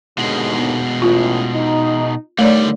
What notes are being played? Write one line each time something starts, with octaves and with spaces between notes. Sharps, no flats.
D#2 G#2 B2 D3 G#3
B3
A1 F4
D#4
D3 D#3 G3 A3 C#5 D5